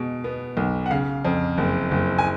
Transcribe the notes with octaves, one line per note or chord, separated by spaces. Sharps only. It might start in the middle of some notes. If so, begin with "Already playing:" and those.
Already playing: B2 G#3
B3
B1
F#5
C#3 F5
F2
F#1
F#1
G#5